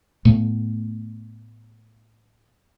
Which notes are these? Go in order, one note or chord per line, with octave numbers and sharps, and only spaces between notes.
A2 A3 B3